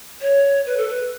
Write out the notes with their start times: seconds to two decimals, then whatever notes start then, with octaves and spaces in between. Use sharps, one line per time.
0.21 C#5
0.66 B4
0.77 A4
0.89 B4